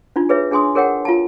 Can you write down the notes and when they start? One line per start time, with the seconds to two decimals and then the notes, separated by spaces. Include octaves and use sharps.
0.16 D4 D#4 F4
0.29 G#4 B4 C#5 E5
0.51 D4 G#4 G#5 C6 D#6
0.75 G#4 A#4 C#5 F#5 G5
1.05 F4 F5 A5